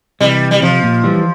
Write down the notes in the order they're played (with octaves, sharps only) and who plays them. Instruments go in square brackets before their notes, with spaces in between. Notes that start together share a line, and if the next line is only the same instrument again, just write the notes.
[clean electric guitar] C3 E3 [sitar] G3
[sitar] G3
[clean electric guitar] C3 [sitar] F3
[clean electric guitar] A#2
E3 G3